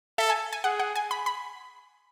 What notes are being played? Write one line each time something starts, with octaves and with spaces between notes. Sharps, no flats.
A4 E5
G#5
G#5
G#4 F#5
F#5
G#5
B5
B5